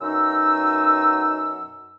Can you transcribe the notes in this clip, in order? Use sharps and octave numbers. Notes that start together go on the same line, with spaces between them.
F#2 B2 D#4 E6